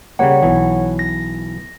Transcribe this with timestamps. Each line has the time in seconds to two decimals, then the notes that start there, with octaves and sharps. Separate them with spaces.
0.19 C#3 G3 A#3 C#5 F#5
0.43 B1 E3
0.99 A#6